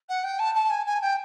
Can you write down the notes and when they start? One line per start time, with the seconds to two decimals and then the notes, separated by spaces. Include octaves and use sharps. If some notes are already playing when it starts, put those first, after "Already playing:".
0.09 F#5
0.23 G5
0.39 A5
0.54 A5
0.70 G#5
0.86 G#5
1.01 G5